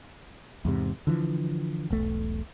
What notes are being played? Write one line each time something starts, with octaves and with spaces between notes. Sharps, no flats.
E2 G#2 C3
D3 E3 F3
E1 B1 A3